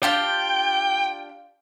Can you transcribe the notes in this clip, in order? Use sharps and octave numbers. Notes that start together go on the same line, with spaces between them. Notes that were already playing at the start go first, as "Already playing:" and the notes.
D4 F4 G4 G5